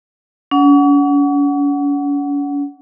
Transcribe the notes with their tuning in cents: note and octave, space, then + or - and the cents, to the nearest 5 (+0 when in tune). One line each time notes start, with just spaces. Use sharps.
C#4 +45 F#5 +0